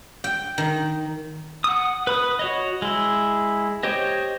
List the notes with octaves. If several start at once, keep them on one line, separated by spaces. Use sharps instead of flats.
G5
D#3
F#5 D#6
B4 B5 D#6
F#4 C#5 D#5
G#3 E4
G4 C5 C#5 D#5